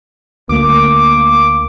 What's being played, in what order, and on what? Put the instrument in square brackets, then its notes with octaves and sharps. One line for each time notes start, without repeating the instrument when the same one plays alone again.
[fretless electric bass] D2 A3 [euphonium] A#3 [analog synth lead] D6